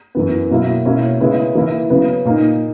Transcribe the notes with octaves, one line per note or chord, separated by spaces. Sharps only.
F#2 E3 B3
B2 F#3 A#3 E4
B2 A#3 C#4 E4
C#3 G#3 B3 E4
E3 A#3 E4
C#3 F#3 B3
A#2 A#3 D#4